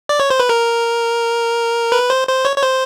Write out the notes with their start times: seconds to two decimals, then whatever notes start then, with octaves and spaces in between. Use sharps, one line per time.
0.09 D5
0.20 C#5
0.30 C5
0.40 B4
0.49 A#4
1.92 B4
2.10 C5
2.28 C5
2.45 C#5
2.57 C#5
2.63 C5